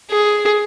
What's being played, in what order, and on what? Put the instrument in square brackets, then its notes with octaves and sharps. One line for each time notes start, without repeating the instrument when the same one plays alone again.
[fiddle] G#4